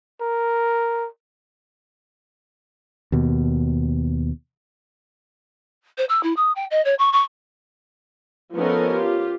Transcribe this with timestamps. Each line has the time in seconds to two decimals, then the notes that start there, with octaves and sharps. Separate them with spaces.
0.21 A#4
3.12 D#2 B2
5.98 C5
6.09 E6
6.23 E4
6.37 D#6
6.56 G5
6.71 D#5
6.85 C#5
6.99 C#6
7.13 C#6
8.56 F3 B3 C#4 D#4 A4 A#4
8.93 F4 G4